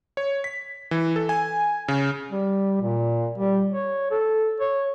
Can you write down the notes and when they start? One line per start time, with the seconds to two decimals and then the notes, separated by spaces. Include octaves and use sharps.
0.17 C#5
0.44 B6
0.91 E3
1.16 A4
1.29 G#5
1.88 C#3
2.31 G3
2.81 A#2
3.38 G3
3.72 C#5
4.11 A4
4.60 C#5